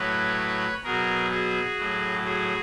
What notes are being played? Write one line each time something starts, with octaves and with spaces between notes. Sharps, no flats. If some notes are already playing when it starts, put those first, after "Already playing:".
Already playing: A2 F#3 B4 C#5
B2 F#3 G#4 A#4
F#4 G#4
A2 F#3
F#4 G#4